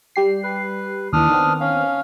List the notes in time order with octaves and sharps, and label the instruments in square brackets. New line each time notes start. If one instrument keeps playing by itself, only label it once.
[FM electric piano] G3 G4 C7
[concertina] B4
[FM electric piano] D#2 E3 [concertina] D4 D#6 F6
[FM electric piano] D#3 B3 C4
[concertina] C#4 F5